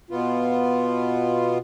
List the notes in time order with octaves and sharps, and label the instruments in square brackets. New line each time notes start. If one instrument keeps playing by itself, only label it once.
[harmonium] B2 B3 F4